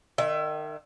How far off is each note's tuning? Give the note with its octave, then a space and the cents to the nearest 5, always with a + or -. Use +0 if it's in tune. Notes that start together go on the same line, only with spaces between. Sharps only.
D#3 -25 E5 +20